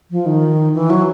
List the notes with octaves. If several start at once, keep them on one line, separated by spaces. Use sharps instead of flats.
F3
D#3
E3
F#3